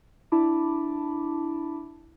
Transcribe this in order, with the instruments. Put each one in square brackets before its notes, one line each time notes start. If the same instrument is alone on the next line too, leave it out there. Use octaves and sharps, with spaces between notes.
[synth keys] D4 E4 A5 B5 D6